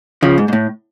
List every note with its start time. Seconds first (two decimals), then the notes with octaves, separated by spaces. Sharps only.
0.23 C#3 F3
0.38 G#2
0.48 G#2
0.53 A2